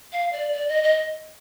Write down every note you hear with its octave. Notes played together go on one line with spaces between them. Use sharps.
F5
D5
D5
D#5
D#5